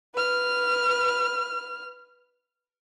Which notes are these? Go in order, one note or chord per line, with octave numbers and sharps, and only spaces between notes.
B4 F6